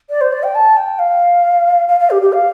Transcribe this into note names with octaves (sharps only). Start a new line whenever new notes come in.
D5
C5
D5
G5
A5
G5
F5
F5
F5
G4
G4
F5